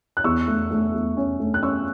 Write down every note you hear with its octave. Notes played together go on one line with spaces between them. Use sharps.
F#6
E2 C#6 E6
A3
A3
E2
C#4
A3
F#6
C#4 C#6 E6